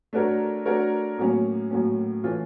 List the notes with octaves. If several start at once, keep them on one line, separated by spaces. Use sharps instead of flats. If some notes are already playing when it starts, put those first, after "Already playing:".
A3 D4 F#4 A#4 C#5
A3 D4 F#4 A#4 C#5
A2 F#3 A#3 C#4
A2 F#3 A#3 C#4
E3 A3 C#4 F4